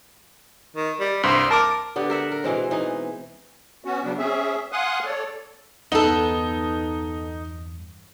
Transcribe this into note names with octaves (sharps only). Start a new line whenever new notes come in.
D#3
G3
C2 G2 C5
A#4 A5 D6
D3 B3 G4
A#4 E5 F#5
A#4
B2 E3 G#3 C4
E3 D#4
B3 C#4 F#4
C#3 F#3 G3 B3 D4
C4 C#4 G#4 E5
F5 F#5 G#5 C6 D#6 F#6
A4 C#5 D5
E2 G2 B3 D#4 A4